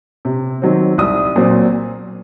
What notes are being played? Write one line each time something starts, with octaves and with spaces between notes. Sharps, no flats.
C3
D#3 F#3 C4
C2 D#6
A#2 F#3 C4